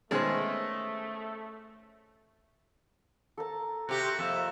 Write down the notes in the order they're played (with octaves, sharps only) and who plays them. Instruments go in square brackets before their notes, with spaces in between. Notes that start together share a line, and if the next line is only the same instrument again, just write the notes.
[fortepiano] B2 D#3 G#3 [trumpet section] A3 [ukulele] C#4 C5
[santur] A4 A#4 A5
[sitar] C3 G4 [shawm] F#4
[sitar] F2 [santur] A#3 [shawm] E5